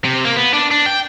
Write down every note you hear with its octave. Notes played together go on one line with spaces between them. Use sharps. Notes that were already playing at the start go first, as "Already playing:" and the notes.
C3
A#3
B3
D4
D4
G5